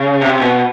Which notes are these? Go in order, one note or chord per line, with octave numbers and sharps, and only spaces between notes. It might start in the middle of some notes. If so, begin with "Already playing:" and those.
Already playing: C#3
C3
B2